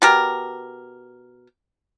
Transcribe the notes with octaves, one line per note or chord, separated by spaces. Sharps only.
B2 G4 A#4